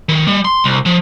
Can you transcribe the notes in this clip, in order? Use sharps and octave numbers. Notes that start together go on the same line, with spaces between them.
D#3
G3
C6
C2
F3